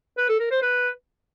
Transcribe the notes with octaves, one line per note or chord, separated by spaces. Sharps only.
B4
A4
A#4
C5
B4